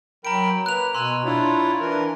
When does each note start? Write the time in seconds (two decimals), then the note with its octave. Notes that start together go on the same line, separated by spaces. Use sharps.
0.25 F#3 A#4 G5 A#5 B5 D7
0.66 A#3 B4 F#6 F7
0.95 B2 G#5 C6 E6
1.25 D4 E4 F4 C#5
1.81 E3 D4 A#4